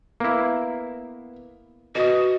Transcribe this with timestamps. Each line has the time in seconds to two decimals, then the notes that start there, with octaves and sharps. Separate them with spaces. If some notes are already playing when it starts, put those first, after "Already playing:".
0.20 A#3 B3 E4
1.95 F#4 B4 D#5 D#6